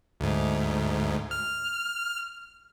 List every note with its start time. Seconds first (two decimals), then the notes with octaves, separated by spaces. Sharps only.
0.20 D2 G#2
1.31 F6